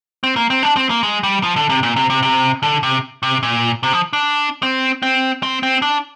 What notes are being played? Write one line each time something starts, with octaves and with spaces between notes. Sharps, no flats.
C4
A#3
C4
D4
C4
A#3
G#3
G3
F3
D3
C3
A#2
C3
C3
C3
D3
C3
C3
A#2
C3
F3
D4
C4
C4
C4
C4
D4